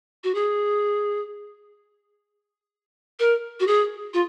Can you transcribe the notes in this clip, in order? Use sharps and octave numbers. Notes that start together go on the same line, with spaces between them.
F#4
G#4
A#4
F#4
G#4
F4